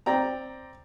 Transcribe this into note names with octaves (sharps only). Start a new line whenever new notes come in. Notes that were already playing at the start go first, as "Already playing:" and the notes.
C4 D5 G5 A#5